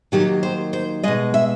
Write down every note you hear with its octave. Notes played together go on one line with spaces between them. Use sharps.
D#2 D#3 F#3 A#3 G4
C5
C5
B2 G#3 D#5
E5